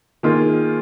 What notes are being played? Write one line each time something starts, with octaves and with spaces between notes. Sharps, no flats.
D#3 A#3 F4 G#4